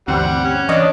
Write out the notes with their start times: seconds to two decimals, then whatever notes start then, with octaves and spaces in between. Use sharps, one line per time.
0.08 D2 G2 E3 G3 C4 F#5
0.44 C#4
0.69 E3 D4 C#5 D#5